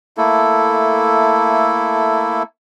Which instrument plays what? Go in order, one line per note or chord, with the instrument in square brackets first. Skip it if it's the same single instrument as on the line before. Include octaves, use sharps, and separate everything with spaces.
[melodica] A3 A#3 E4 A4